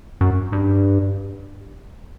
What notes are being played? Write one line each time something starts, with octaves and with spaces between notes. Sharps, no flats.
F#2
G2